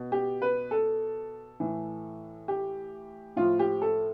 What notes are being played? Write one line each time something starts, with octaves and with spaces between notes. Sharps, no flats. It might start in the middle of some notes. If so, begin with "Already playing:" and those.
Already playing: B2
G4
B4
A4
A2 E3
G4
A2 F3 F4
G4
A4